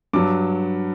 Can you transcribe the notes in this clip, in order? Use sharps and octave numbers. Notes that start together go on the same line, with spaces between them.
G2 F#3 D6